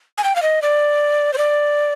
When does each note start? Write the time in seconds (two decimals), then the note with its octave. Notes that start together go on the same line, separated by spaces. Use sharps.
0.18 G#5
0.24 G5
0.36 F5
0.42 D#5
0.62 D5
1.33 C5
1.38 D5